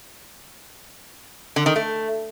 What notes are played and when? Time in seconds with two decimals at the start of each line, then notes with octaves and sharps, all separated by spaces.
1.56 D3
1.66 D#3
1.76 A3